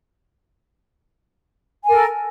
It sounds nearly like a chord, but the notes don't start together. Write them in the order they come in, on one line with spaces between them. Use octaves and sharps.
G#5 A#4 A4